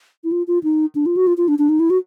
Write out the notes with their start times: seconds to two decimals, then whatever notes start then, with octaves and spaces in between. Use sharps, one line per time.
0.24 E4
0.32 F4
0.47 F4
0.63 D#4
0.95 D4
1.06 F4
1.17 F#4
1.27 F4
1.37 F4
1.48 D4
1.59 D4
1.69 D#4
1.80 E4
1.90 F#4